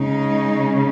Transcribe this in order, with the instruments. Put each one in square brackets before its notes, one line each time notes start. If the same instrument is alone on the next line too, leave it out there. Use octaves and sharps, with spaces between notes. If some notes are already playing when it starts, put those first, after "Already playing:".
Already playing: [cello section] C#3 G#3 D#4